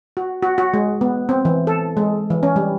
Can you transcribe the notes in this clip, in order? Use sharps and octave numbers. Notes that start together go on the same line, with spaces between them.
F#4
F#4
F#4
G#3
B3
C4
E3
A4
G#3
E3
C#4
G3